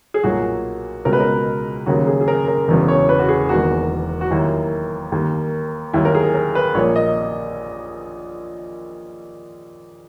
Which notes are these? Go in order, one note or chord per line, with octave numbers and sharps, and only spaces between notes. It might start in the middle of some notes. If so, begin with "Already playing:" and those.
G#4
B1 A#2 F#3 A#3 F#4
C#2 B2 G#3 A#4
B4
A#4
D#2 C#3 F#3 A#3 F#4
G#4
G#4
A#4
A#4
E1 E2 C#3
C#5
B4
F#4
G#4
E1 E2 D#3 A#3 F#4
F#4
D#2 D#3 F#3 A#3 E4
D#2 D#3 A#3
D#2 D#3 F#3 E4
A#4
G#4
A#4
B4
A#1 A#2 A#3 C#5
D#5